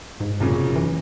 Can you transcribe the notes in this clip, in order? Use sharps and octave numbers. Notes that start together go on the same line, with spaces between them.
G#2
F1 F#2 A#2 C#3
E3